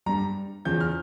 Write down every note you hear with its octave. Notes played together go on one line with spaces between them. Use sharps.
G2 G3 A#5
E2 C#3 F3 G6
F6